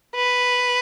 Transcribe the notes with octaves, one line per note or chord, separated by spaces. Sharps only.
B4